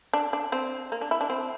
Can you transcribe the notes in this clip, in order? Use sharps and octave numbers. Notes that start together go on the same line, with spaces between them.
D4
D4
C4
A#3
D4
E4
D4
C4